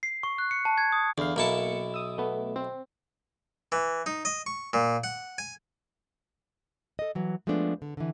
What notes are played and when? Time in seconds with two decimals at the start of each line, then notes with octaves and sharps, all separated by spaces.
0.03 C7
0.23 C#6
0.38 F#6
0.51 C#7
0.65 A5
0.78 G#6
0.92 D#6
1.18 E2 D3 F5
1.36 B1 A#3 E4 A5 C#7
1.94 D#6 E6
2.18 A3 B3
2.56 C4
3.72 E3
4.06 D#4
4.25 D#5
4.46 C#6
4.73 A#2
5.04 F#5
5.38 G#5
6.99 A4 D#5
7.15 E3 F#3
7.47 F3 G#3 A3 B3 D4
7.82 D3
7.97 D3 E3